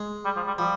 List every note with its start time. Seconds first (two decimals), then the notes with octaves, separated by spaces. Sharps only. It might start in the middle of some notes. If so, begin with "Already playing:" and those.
Already playing: G#3
0.25 G3
0.36 F3
0.47 G3
0.58 F3 G3